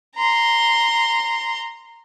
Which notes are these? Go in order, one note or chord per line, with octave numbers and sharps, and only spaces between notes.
A#5 C6